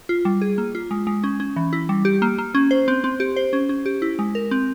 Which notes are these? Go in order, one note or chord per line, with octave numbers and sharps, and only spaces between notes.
F4
G3
G#4
A#3
F4
G#3
G#3
C#4
C#4
E3
E4
G3
G4
A#3
A#3
C#4
C5
C4
C4
G4
C5
C#4
C#4
G4
E4
G#3
A#4
C4